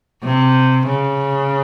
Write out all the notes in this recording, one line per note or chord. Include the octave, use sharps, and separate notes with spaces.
C3
C#3